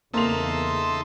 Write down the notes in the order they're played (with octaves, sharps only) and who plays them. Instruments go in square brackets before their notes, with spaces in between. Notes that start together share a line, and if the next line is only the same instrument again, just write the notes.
[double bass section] E2 C#3 [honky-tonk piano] A#3 F7 [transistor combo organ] D#4 A4 E5 [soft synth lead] C6